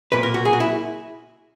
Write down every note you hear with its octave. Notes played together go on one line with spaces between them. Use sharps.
B1 A#2 A#3 B4
A#4
F#4
G#4
F#4
E4